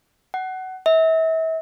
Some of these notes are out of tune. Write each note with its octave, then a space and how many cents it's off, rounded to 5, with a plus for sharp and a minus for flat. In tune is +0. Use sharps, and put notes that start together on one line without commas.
F#5 +20
E5 -35